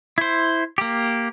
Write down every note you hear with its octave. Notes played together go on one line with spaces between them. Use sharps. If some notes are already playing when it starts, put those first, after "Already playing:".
E4 C5
A#3 G4